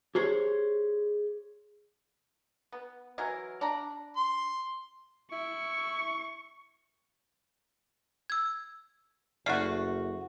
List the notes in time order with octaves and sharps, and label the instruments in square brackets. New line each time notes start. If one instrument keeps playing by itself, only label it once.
[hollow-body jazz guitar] G4 G#4 C5 C#5
[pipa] B3
E3 F#3 A#4
D4 D5 A#5
[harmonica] C6
[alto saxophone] E4 [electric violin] C#6
[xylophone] E6 G#6
[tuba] F#1 [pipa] A3 F#4 [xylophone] D5 F6 C7